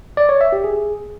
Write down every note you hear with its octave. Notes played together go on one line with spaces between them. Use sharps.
D5
C#5
E5
G4
G#4